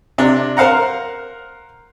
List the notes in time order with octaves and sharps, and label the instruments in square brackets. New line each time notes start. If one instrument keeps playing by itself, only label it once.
[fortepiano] C3 D4
A#4 C5 F5 F#5 A#5